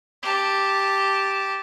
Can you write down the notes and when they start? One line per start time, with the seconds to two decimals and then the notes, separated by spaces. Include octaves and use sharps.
0.22 G4 A5